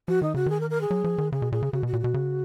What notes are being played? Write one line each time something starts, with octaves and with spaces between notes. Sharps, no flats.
F3 F#4
D#3 D#4
C#3 F#4
D#3 G#4
A#4
A#4
G#4
F#3
F3
D#3
C#3 G#4
B2
A#2 G#4
C#3
C#3 F#4
B2 F#4
A#2
B2 F#4
C#3